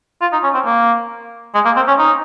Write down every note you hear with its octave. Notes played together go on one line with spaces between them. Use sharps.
F4
D#4
C#4
C4
A#3
G#3
A#3
C4
C#4
D#4